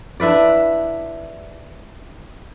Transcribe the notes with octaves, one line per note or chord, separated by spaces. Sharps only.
D4 E4 B4 D5